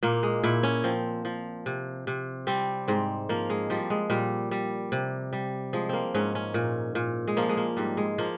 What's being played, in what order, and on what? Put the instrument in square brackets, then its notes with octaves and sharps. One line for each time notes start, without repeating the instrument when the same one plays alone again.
[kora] A#2 A#3
G#3
A#2 E4
C#4
F3 C4
F3
C3
C3
G3 C4
G#2 C4
F3 A#3
G#3
F3 G3
G#3
A#2 G3
G3
C3
G3
F3 G#3
A#3 C4
G#2 C#4
C#4
A#2
A#2
G#3
F3 A#3
G#3
A#3
G#2 G3
G#3
F3 A#3